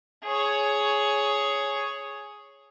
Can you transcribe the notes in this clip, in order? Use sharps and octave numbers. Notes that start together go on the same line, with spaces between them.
G#4 C#5